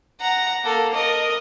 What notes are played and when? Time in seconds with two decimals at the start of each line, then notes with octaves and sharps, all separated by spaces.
0.21 F#5 A#5
0.64 A#3 A4
0.94 A#4 D#5